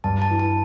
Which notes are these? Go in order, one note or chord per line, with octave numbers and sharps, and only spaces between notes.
G2 A5
A5
E3
A5